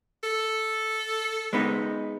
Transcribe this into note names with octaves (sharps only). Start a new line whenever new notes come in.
A4
G#3 B3 D#4